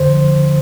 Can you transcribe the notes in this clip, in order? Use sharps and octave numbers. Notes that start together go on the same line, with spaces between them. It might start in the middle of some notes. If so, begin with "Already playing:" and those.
Already playing: F2 D3 C5
F3